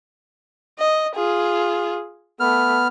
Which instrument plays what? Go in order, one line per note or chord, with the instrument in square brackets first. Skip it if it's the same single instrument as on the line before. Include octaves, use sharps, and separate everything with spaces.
[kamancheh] D#5
F4 G#4
[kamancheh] A3 [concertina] B3 F6